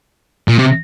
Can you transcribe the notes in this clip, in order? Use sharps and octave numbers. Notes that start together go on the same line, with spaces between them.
A#2
C3